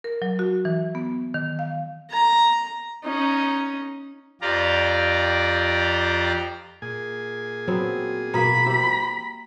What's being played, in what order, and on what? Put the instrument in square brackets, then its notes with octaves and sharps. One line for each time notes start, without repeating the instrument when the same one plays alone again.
[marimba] A#4
F#3
F#4
E3
B3
D#3
F5
[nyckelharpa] A#5
C#4 D#4
[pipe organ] F2 F4 G4 D5 A#5
[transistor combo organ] A#2 G#4 G#5
[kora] F#3 B3 C4
[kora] B2 A#3 [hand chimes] A#5 [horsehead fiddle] B5
[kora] E4 G4 C5